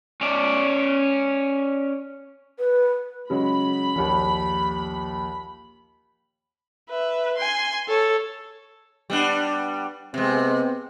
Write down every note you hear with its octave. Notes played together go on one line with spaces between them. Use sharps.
C#4 D5
B4
C#3 F#3 G#3 B5
A#1 D#2
B4 E5
G#5 C6
A4 C#5
G3 B3 D4
C3 G#3 B3 C4